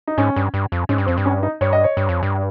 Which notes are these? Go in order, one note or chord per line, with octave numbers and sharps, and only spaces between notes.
D#4
G#2 C#4
G2
G2
F2
G#2 C#4
G2
F2 C4
G2
C#4
D#4
G2 C#5
D#5
C#5
G2
F2
G2